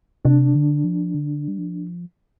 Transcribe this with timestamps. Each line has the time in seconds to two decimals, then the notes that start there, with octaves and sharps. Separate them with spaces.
0.25 C3 D4
0.55 D3
0.84 F3
1.15 D3
1.48 G3
1.59 F3